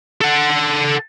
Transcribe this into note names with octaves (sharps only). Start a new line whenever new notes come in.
A4 F#5